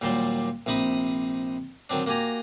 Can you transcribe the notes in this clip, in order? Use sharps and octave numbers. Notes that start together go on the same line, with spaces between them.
D#2 A#2 F#3 G3 C5 D5
A#1 C3 D#4 B5 D#6
D#3 F#3 C4 D4
A#3 F#4 G4 G#5 A#5